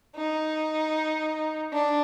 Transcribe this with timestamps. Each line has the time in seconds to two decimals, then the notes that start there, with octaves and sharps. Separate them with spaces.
0.16 D#4
1.73 D4